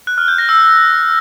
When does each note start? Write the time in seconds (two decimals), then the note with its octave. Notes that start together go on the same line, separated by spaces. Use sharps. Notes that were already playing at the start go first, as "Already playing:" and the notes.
0.07 F#6
0.18 F6
0.28 G6
0.38 A#6
0.49 E6